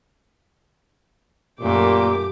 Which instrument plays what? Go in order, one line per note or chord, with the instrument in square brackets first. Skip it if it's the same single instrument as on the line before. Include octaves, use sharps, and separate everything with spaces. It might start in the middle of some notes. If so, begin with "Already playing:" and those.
[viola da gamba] F#2 A3 [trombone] A#2 [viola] G4 D6